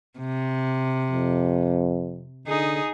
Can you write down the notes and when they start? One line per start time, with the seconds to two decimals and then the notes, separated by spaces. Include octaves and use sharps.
0.19 C3
1.09 F2
2.47 D3 D#4 G#4